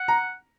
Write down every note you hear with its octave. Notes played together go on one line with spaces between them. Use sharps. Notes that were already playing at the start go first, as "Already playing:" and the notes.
Already playing: F#5
A#5